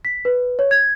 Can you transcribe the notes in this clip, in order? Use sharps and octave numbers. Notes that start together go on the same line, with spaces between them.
B6
B4
C#5
G#6